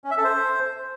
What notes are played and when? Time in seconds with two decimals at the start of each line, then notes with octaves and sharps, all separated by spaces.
0.04 C#4
0.11 E5
0.17 A4
0.24 C5